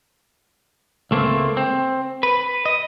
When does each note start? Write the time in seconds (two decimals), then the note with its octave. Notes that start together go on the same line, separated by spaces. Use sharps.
1.11 C#2 A3 A#3 C4
1.57 C4
2.23 B4
2.66 D#5